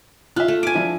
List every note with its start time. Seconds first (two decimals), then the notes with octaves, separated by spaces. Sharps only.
0.36 F4 E5 F#6
0.48 A3
0.63 G#5 D6
0.75 F3 D4 E4